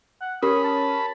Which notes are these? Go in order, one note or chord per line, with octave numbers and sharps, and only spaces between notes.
F#5
C#4 G4 A#4 B5 D#6
A5